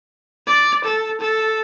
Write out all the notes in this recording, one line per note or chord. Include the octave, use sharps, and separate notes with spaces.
D5
A4
A4